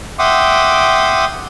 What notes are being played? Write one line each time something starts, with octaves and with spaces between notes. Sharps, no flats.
E5 F#5 G5 C6 D6 D#6